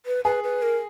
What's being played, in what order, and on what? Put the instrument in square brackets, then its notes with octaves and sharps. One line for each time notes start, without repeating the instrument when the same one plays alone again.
[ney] B4
[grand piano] G#4 [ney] B4
[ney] B4
A#4